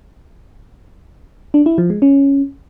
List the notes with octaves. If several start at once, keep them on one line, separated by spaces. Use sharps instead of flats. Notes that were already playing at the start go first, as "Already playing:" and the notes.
D4
E4
F3
G#3
C#4